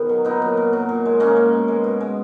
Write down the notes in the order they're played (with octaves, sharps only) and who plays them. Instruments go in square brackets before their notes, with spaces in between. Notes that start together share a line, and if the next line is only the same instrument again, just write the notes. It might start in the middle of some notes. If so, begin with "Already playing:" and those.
Already playing: [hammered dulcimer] B2 D#3 B3 D#4 G#4
F#3
A#2 B3 D#4
F#3
A#2
F#3
A#2
G#3
A#2 A#3 C#4
G#3
B2
G#3
B2
G#3